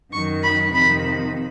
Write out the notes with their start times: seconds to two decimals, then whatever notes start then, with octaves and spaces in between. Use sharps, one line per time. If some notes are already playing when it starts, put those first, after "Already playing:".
0.12 F#2 D#3 F#3 C#6
0.43 B5
0.73 F2 C3 D#3 B5